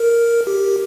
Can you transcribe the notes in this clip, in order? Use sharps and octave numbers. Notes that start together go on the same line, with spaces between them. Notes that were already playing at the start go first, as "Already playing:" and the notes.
Already playing: A#4
G4